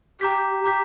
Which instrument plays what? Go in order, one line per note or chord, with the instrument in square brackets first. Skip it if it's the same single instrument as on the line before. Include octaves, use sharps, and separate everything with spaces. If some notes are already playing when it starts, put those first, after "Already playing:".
[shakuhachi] G4 [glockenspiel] A#5 D6 G6 B6
[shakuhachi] G4 [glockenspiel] A#5 D6 G6 B6